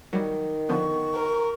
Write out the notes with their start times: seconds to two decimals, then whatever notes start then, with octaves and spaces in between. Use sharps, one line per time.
0.13 D#3 F#3 G3
0.69 D3 F3 B3 C#6
1.14 A#4